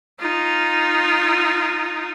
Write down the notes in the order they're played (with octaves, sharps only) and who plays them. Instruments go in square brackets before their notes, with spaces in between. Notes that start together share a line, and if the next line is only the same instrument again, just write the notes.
[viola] D#4 F4